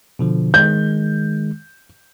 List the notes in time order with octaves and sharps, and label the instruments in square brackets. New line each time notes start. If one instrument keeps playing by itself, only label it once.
[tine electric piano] B2 D3 F3
[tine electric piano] D#3 G#3 [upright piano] G6